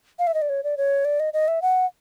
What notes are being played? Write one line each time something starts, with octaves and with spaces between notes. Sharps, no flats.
F5
E5
D#5
D5
C#5
D5
C#5
D5
D#5
D#5
E5
F#5